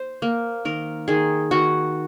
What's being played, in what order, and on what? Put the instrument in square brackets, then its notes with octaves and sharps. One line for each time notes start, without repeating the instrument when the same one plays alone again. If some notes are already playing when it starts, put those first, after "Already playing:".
Already playing: [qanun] C5
A#3
D#3 A#4
D#3 G#4
D#3 F#4